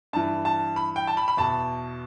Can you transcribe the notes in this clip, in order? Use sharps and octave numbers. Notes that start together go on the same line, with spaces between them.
G2 E3 A5
A5
B5
G5
A5
B5
B5
E2 B2 A5